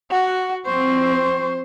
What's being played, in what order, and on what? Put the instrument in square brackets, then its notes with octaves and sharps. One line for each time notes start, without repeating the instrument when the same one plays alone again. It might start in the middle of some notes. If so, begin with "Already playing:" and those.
[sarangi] F#4 [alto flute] F#5
[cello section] F3 C4 [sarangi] C5 [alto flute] C#6